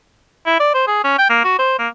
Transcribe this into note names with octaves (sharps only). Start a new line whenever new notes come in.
E4
D5
C5
G#4
C#4
G5
A#3
F#4
C5
A#3